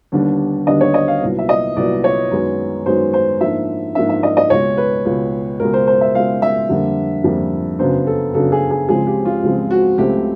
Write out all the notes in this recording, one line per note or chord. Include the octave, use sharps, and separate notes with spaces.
D#2 D3 G3 B3 D4
D#2 D3 G3 B3 D4 D#5
C#5
D#5
F5
C2 A#2 F#3 B3
E5
D#5
C2 A#2 F#3 B3 D5
C#5
F#2 D#3 G#3 B3
F#2 D#3 G#3 B3 C5
C5
G#2 F3 A#3 D4 E5
G#2 F3 A#3 D4 E5
E5
D#5
D#5
C#2 B2 G#3 C#5
B4
C#2 B2 G#3
C#2 B2 G#3 A#4
C5
C5
E5
C#2 B2 G#3 F5
E5
F2 D3 G3 A#3 D4
F2 D3 G3 A#3 D4
F#2 C#3 F#3 B3 D4 C5
A4
F#2 C#3 F#3 B3 D4 A4
G#4
G#4
C#2 C#3 F3 G#3 C4 G#4
G4
F4
C#2 C#3 F3 G#3 C4
F#4
C#2 C#3 F#3 A3 C4 G4